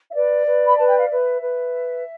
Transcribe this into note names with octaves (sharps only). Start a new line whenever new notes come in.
E5
B4 D5
B4
B5
B4 A5
G5
F5
B4 E5
B4